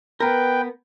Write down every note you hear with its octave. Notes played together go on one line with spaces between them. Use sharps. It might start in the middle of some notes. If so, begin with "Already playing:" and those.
B3 A#4 B4 G5